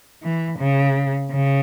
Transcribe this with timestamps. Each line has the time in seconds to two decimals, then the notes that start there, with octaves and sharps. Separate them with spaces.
0.23 E3
0.59 C#3
1.31 C#3